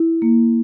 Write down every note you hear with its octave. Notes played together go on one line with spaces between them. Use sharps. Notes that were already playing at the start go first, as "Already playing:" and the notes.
Already playing: E4
A#3